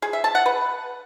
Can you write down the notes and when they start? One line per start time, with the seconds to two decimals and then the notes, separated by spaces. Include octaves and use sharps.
0.02 G#4
0.13 E5
0.24 A5
0.35 F#5
0.46 B4